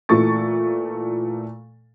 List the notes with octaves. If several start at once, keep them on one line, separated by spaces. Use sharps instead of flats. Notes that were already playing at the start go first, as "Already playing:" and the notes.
A#2 E3 A3 A4 C#6 A6